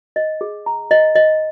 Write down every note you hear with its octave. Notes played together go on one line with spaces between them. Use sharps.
D#5
G#4
A#5
D#5
D#5